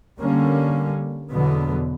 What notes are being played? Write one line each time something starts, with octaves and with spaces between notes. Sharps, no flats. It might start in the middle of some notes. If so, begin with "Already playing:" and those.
D3 G3 A#3 C#4
E2 B2 D3 F#3 B3